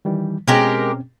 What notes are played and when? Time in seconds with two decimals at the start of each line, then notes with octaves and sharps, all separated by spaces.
0.05 D#3 E3 G3
0.48 B2 G#3 C4 C#4 G4 A#4